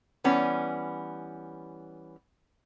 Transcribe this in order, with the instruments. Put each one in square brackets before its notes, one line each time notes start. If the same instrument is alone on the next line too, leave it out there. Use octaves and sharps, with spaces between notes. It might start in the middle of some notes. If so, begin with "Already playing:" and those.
[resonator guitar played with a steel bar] E3 G3 B3 C#4